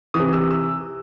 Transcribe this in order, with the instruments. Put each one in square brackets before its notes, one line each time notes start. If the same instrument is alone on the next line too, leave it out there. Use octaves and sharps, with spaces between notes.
[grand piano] E3 D#6
C3
E6
E6